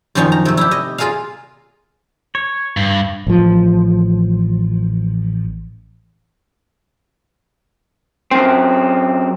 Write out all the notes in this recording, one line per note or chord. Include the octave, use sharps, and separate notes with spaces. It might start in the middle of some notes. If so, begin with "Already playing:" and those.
F#2 D#3 F3 C#4 D#4
A#5
C3 A3
E4 G4
D#5
F4 G#4 A#4 D#5 F5
C#5
G2
A1 F3
F#2 C4